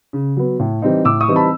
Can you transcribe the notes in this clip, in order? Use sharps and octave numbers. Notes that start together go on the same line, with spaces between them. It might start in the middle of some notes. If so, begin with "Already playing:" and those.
C#3
F#3 B3
A2
E3 G3 C4 D#4
A2 D6 E6
C#6 D#6
E3 G3 C4 D#4
A5 B5